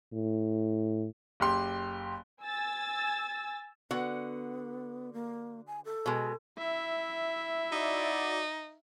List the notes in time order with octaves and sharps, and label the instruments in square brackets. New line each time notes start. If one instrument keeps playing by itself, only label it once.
[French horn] A2
[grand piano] F#1 G4 C6
[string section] G#5 E6 A6
[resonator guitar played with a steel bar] D3 F#4 F#5 [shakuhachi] B3
[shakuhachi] A#3
G#5
A4
[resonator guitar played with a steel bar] B2 G#3
[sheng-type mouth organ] E4 [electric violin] E5
[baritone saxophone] D#4 [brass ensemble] F#4 D5